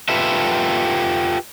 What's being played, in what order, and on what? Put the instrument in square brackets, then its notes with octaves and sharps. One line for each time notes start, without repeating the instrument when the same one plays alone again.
[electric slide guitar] F4 G4 A4 B4 E5